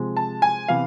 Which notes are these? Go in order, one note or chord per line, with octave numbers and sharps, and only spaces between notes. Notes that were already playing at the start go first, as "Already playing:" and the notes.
Already playing: C3 F3 G#3
A5
G#5
C3 E3 B3 F5